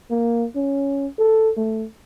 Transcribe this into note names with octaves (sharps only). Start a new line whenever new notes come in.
A#3
C#4
A4
A3